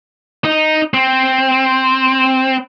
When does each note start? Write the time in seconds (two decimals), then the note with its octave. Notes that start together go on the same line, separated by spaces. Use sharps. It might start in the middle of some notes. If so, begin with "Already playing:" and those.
0.44 D#4
0.94 C4